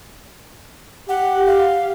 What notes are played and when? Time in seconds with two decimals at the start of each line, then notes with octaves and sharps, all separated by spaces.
1.09 G4 F#5
1.46 F5